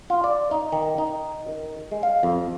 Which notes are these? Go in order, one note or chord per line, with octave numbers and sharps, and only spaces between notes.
F4
D5
D#4
D#3
D#4
D#3
G#3
F5
F2